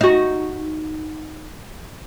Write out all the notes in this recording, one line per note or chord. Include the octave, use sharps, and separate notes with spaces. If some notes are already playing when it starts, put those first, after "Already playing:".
D#4 F#4